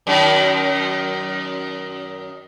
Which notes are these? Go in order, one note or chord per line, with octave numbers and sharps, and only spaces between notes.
F#2 D#3